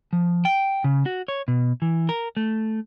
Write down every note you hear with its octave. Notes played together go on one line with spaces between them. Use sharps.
F3
G5
C#3
F#4
C#5
B2
E3
A#4
A3